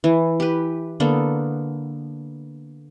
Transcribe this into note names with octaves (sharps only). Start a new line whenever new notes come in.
E3
G4 B4
D3 A#3 B3 A4